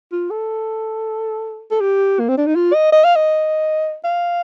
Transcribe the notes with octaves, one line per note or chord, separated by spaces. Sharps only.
F4
A4
A4
G4
A#3
C4
D4
D#4
F4
D#5
D#5
F5
D#5
F5